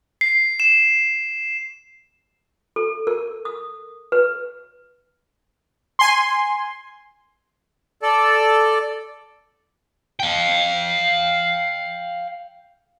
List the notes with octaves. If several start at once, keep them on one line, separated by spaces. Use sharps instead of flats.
C7
E7
A4
A#4
D#6
B4
G#5 C6
A4 D5
F5 G5